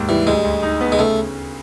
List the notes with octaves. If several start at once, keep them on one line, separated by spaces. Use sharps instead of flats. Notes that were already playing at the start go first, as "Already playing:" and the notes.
Already playing: D#2 G#2
E3 G3
D2 G#3
D2
D#4
B3
G#3
C#3 A3